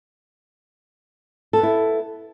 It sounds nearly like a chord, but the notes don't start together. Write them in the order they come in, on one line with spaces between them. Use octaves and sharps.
A4 B3 E4